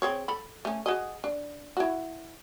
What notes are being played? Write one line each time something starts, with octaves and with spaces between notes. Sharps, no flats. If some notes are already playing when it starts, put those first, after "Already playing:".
C4 G#4 C#5
A4 B5
A3 C#4
F#4 G#4 D#5
D4
E4 F#4